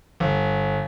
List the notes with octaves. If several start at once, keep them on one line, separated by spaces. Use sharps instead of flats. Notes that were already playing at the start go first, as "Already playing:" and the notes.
G1